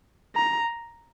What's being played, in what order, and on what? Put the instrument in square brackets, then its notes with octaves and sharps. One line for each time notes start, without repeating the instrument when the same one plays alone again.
[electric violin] A#5